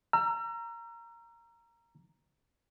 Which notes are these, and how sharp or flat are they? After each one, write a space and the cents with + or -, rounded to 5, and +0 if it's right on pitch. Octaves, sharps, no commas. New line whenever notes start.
A#5 +0 E6 +45